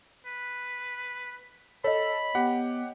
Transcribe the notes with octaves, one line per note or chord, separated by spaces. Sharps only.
B4
A4 C#5 D#5 B5
B3 G4 F#5